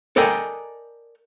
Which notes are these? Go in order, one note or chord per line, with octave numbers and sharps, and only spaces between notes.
A4 A#4 D5 D#5 G5 G#5